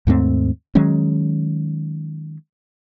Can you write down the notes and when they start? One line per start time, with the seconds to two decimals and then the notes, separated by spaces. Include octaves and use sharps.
0.07 D#2 G#2 A3 C4
0.75 D#3 F#3 G#3 C#4